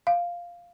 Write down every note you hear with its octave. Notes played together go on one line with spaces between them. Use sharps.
F5